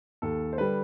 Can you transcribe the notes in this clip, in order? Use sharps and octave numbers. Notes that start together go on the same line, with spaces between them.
D#2 A4
C5
D3 G3 B4